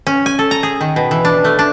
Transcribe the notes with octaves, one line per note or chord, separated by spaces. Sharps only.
C#4
G#5
A4
A#5
G#4
D#3
B2
E3
D4
A3
D4